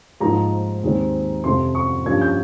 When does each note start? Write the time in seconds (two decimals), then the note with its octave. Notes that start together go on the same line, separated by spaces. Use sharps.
0.20 G#2 F3 A#3 D#4 A#5
0.83 D#2 D#3 G#3 C4
1.44 F2 C3 F3 C6
1.75 C#6
2.06 G2 F3 A#3 C#4 G#6
2.22 G6